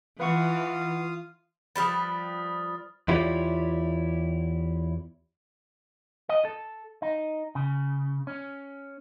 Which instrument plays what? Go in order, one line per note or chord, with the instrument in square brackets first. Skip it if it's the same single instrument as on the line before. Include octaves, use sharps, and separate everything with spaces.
[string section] E3 [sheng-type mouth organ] F4 F5 D#6 [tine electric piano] B4 F#5 C#6
[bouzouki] F3 G3 B4 [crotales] D#6 F6 A6
[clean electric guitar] E2 E4 F4 G4 C#5 D5
D#5
A4
D#4
C#3
C#4